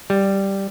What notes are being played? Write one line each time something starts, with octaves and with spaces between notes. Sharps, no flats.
G3